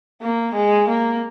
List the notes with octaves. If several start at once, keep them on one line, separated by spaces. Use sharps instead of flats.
A#3
G#3
A#3